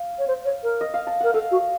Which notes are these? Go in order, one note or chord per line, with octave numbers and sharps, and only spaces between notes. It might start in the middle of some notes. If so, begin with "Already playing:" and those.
Already playing: F5
C#5
C5
C#5
A#4
D#5
F5
A5
A#4 F#5
A4 F5
F#4